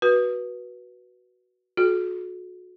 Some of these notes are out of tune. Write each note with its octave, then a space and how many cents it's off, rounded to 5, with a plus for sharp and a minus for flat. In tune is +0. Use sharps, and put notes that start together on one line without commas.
F#4 +0 B4 -15
F#4 -30 A4 -45